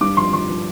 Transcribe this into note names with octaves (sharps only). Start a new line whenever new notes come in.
G2 D6
F3 C6
F3 C6
F3